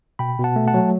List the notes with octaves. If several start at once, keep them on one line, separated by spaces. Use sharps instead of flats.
B2 G5 B5
B2
F#5 A5
A3
F#5 A5
F#3